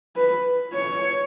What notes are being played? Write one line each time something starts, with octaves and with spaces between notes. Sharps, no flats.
B4
C#5